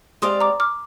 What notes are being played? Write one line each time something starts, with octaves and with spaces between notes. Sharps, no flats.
G#3 C4 G4 D5 F5 C6 D#6
A#5 D6
D6 F6